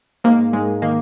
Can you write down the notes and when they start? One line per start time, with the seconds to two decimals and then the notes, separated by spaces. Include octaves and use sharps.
0.24 G#2 A#3
0.53 G#2 G#3
0.82 D#3 A#3